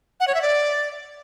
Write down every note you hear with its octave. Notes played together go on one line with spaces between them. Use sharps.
F#5
C#5
E5
D5